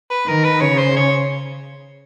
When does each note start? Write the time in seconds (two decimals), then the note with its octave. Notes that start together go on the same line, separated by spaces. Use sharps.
0.10 B4
0.27 D#3 A#4
0.44 B4
0.61 C#3 C#5
0.78 C5
0.97 C#5